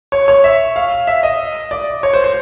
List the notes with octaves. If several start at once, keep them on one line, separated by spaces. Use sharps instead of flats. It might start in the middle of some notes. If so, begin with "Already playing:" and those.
C#5
C#5
E5
F5
E5
D#5
D5
C#5
C5
C5